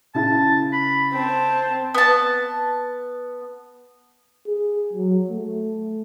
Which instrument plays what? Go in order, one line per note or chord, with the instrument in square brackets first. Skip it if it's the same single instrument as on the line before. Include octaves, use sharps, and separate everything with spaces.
[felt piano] C#3 E4 [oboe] A5
[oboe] B5
[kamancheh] C4 A5 [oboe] G5
[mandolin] B3 A5
[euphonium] G#4
F#3
A3